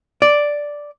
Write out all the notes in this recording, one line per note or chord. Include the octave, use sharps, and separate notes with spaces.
D5